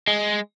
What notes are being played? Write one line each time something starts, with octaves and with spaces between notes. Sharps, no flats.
G#3